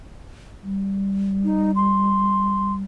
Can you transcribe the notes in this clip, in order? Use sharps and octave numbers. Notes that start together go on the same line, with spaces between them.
G3
D#4
C6